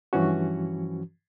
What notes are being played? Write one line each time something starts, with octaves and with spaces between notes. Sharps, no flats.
G2 E3 F3 C#4 F#4